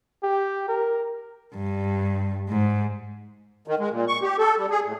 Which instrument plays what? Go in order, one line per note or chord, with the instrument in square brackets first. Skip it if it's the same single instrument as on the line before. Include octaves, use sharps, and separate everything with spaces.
[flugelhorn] G4
A#4
[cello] G2
G#2
[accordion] D#3
G#3
A#2
C#6
G4
A4
G3
G#4
A2